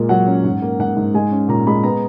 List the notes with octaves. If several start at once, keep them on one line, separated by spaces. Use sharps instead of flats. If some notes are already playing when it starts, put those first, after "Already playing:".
Already playing: A#2 G#3 A#3
F#3 F#5
C#4
G#2
A#3
G#2 F#5
G#2
G#3 G#5
C#4
A#2 A#5
G#3 B5
B3 A#5